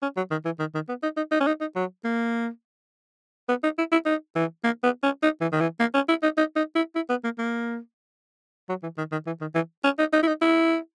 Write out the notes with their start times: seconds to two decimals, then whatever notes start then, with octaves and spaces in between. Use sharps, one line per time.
0.02 C#4
0.17 F#3
0.31 D#3
0.45 E3
0.60 D#3
0.74 D#3
0.89 B3
1.03 D#4
1.17 D#4
1.32 D#4
1.40 C#4
1.47 D#4
1.61 D#4
1.76 F#3
2.05 A#3
3.49 B3
3.63 D#4
3.78 E4
3.92 E4
4.06 D#4
4.36 E3
4.64 A#3
4.83 B3
5.03 C#4
5.23 D#4
5.41 E3
5.52 D#3
5.61 E3
5.80 A#3
5.95 C#4
6.09 E4
6.23 D#4
6.38 D#4
6.56 D#4
6.76 E4
6.95 E4
7.10 B3
7.24 A#3
7.39 A#3
8.69 F#3
8.83 E3
8.98 D#3
9.12 D#3
9.27 E3
9.41 D#3
9.55 E3
9.84 C#4
9.99 D#4
10.13 D#4
10.23 E4
10.28 D#4
10.42 E4